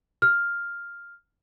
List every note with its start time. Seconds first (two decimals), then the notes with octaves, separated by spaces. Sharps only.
0.22 F6